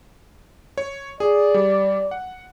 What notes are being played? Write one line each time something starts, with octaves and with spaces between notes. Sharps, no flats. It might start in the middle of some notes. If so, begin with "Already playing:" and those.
C#5
G#4 D5
G3
F#5